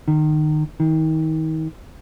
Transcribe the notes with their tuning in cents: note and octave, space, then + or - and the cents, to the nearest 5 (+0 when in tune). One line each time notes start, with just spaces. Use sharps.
D#3 -25
D#3 +30